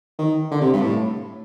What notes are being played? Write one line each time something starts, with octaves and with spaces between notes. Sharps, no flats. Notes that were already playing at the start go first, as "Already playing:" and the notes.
D#3
D3
C3
G2
A2